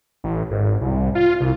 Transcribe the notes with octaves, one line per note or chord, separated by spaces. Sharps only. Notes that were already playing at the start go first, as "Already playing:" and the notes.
A1
G#1
C2
F4
C2